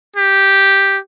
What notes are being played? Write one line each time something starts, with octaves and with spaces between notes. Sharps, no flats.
G4